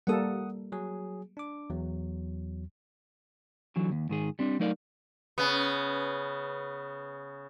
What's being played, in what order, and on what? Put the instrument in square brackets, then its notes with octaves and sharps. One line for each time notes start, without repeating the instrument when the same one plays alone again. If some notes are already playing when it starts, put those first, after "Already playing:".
[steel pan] G3 A#3 A4 [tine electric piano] F#5 D#6
[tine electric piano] F#3 G#4
D4 D6
E2 F#3
[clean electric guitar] D3 E3 F#3
D#2
G#2 D#3 G#4
G3 C4 D4
F#3 A3 D#4 A#4 D5 F5
[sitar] C#3 B3